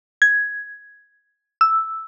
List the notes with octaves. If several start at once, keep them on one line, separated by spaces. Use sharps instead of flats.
G#6
E6